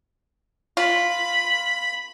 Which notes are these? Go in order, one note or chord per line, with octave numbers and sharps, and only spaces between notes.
F4 B5